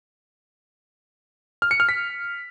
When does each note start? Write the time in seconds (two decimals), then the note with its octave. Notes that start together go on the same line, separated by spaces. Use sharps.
1.62 F6
1.71 C#7
1.80 F6
1.89 B6